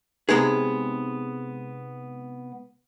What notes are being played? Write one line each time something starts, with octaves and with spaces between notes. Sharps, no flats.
C3 G3 G#3 B3 D#4 G#4